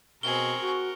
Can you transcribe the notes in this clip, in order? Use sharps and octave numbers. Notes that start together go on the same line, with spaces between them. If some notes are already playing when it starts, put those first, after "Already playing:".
B2 C4 G#4 A#4 C#6 G7
F#4